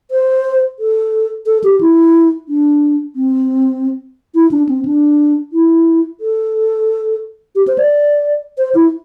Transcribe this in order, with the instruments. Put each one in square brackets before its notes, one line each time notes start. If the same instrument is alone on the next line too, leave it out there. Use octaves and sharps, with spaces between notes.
[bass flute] C5
A4
A4
G4
E4
D4
C4
E4
D4
C4
D4
E4
A4
G4
C5
D5
C5
E4